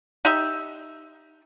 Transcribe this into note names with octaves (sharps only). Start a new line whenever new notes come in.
D#4 G4 E5